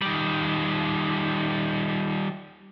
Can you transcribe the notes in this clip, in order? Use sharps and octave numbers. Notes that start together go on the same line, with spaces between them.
D#3 G3